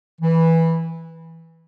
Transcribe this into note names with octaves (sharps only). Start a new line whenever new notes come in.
E3